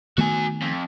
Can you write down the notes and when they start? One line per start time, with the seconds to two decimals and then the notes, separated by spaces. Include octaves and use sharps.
0.18 D#3 A3 B3 F#4 G#5
0.62 F2